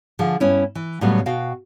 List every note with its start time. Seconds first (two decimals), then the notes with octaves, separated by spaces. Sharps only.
0.19 D3 F3 G#4
0.40 G2 B3 C#4 E4
0.75 E3
1.01 A2 C#3 F#3 G3 A#3 B3
1.26 B2 F#4 F5 G5